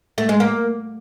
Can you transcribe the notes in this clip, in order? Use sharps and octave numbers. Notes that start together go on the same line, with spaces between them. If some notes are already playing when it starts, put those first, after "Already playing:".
A3
G#3
A#3